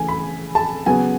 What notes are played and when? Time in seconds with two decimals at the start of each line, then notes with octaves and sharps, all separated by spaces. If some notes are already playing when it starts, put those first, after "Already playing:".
Already playing: C#3 E3 A3 G#5
0.08 B5
0.55 A5
0.86 C#3 F#3 B3 G#5